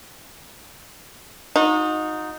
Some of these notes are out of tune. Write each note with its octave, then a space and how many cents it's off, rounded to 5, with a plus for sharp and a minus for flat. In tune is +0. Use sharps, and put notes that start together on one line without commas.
D#4 +0 F#4 -40